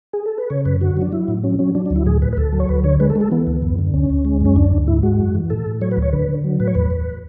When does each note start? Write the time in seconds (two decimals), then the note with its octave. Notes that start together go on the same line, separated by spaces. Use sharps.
0.13 G#4
0.26 A4
0.38 B4
0.50 C#3 C#5
0.65 F#2 B4
0.81 D3 F#4
0.97 F#3 D4
1.12 F#3 E4
1.28 A2
1.43 F#3 C#4
1.59 F#3 C#4
1.75 F#3 D4
1.86 D4
1.90 D2
1.96 E4
2.06 A2 G#4
2.22 A2 B4
2.33 B4
2.37 D2 A4
2.53 F#3
2.60 C#5
2.69 D2 B4
2.84 D3 C#5
3.00 G#3 B4
3.10 A4
3.15 G#3
3.21 A4
3.31 E3 B3
3.47 D2
3.62 F#2
3.78 D3
3.94 D2 C#4
4.10 D2
4.25 G#3
4.41 F#2 C#4
4.56 D2 D4
4.71 D2
4.87 G#2 E4
5.03 G#3 F#4
5.19 F#2
5.35 E3
5.50 A2 A4
5.66 A2
5.81 F#3 C#5
5.91 B4
5.97 D2
6.02 C#5
6.13 D3 B4
6.29 D3
6.44 F#3
6.60 A2 B4
6.67 C#5
6.75 E2 B4
6.90 E2